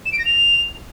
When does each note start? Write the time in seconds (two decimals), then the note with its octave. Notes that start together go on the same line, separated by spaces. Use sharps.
0.06 E7
0.12 D7
0.19 A#6
0.25 F7